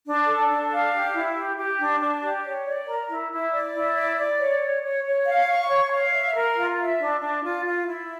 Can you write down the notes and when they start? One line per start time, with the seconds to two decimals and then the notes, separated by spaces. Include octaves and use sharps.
0.06 D4
0.27 A4
0.49 D4
0.70 F5
0.92 G4
1.14 E4
1.36 G4
1.57 G4
1.78 D4
2.00 D4
2.22 G4
2.44 C#5
2.66 D5
2.87 A#4
3.09 E4
3.31 E4
3.52 D5
3.74 E4
3.96 D5
4.17 D5
4.39 C#5
4.61 C#5
4.83 C#5
5.04 C#5
5.26 F5
5.47 C#6
5.69 C#5
5.91 F5
6.12 E5
6.34 A#4
6.55 F4
6.78 E5
6.99 D4
7.20 D4
7.43 F4
7.65 F4
7.87 E4